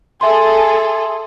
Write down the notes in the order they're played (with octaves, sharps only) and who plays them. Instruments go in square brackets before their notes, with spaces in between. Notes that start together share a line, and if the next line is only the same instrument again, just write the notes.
[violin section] G#4 A4 [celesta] E5 C6